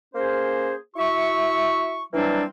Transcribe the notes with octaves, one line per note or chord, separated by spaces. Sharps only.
A#3 C#4 G#4 C5
E4 F#4 E5 C#6
E3 F#3 G3 A#3 C4 D4